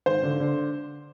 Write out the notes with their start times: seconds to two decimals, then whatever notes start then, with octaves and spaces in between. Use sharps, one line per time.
0.06 G#1 C5
0.23 D3
0.40 D3